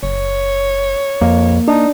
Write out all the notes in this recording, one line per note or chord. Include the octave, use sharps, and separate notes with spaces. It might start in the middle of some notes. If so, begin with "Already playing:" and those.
F#1 C#5
F2 A#3
D4 D#4